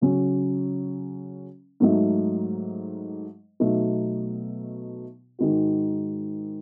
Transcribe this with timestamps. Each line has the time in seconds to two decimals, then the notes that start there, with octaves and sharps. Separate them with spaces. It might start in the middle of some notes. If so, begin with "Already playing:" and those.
0.01 C#3 F#3 C#4
1.80 G#2 F#3 A3 D#4
3.60 B2 F#3 A3 D#4
5.39 G#2 D#3 G#3 D#4 F#4